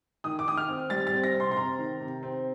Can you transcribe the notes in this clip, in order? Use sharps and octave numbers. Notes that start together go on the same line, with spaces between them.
D#3 D#6
D6
D#3 D#6
F6
C4
G3 A6
A6
C4
A#6
C3
C6
C6
C4 A#5
D#3
C3
C4